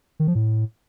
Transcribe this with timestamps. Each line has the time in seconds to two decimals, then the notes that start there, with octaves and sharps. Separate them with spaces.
0.20 D#3
0.27 F3
0.35 A2